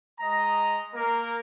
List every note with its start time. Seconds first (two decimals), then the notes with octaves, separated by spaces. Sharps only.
0.20 G#3 D#5 A#5
0.94 A#3 A#4